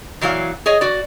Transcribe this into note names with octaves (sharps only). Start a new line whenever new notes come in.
A#2 E3 F#3 A#4 F5
G#4 C#5 D#5
F#4 D5